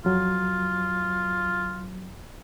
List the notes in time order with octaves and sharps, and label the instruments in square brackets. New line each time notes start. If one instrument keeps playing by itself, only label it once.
[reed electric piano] F2 F#3 [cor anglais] F4